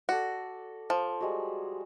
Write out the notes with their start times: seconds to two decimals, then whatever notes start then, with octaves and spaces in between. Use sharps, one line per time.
0.09 F#4 A4 D5
0.90 F3
1.21 G3 G#3 F#4